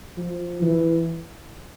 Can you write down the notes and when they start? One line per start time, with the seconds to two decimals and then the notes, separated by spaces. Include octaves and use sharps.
0.18 F3
0.62 E3